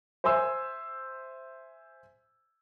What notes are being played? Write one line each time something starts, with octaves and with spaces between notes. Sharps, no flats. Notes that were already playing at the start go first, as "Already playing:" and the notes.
C5 E5 G#5 C6 E6